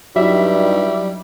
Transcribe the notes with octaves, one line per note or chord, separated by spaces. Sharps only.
G2 F#3 G3 D#4 E4 E5